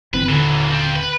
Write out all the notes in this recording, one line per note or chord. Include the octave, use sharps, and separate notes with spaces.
G1 E3 C4 B4
D#1 D3 E3 F#3
F3 C4
B4